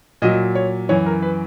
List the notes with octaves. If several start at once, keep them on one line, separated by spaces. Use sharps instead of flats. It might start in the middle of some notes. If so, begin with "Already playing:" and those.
A#2 F#3 D#5
C#5
F#2 E3 C#5
A#4
B4